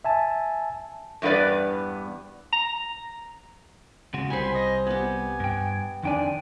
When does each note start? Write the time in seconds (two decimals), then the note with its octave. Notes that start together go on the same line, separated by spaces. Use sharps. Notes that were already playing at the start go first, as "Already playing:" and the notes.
0.05 E5 G#5 A5
1.22 E2 G2 B3 B4 D5
2.53 A#5
4.14 C#3 G#3 F#4
4.30 C2 G3 C5 G#5 B5
4.54 D#5
4.87 B3 G4 G#5
5.40 G2 G5
6.03 F2 D#3 D4 D5 G5 G#5